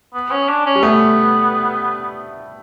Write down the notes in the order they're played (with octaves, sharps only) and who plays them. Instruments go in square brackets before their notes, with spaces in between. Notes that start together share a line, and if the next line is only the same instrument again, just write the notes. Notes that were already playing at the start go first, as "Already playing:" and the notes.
[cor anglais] B3
C#4
D4
C#4
[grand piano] G3
[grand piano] A3 [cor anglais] B3